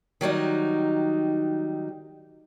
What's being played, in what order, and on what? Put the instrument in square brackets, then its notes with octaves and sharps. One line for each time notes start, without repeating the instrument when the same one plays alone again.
[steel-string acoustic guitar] D#3 F#3 G3 D#4